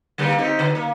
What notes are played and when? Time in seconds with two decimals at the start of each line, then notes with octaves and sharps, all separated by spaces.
0.18 D3 G3 A#3
0.38 C4 D#4 G4
0.59 D3
0.75 A#3